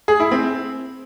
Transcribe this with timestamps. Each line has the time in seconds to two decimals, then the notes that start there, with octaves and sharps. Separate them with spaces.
0.08 G#4
0.20 E4
0.31 C4